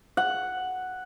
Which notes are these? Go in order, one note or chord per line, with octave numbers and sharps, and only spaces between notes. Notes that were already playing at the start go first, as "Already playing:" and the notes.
F#5